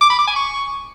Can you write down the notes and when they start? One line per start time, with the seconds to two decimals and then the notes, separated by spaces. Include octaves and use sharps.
0.01 D6
0.10 B5
0.18 D6
0.27 G#5
0.36 C#6